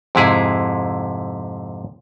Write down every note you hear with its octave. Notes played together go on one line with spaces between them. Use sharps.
F2 G#2 C3 E4 G#4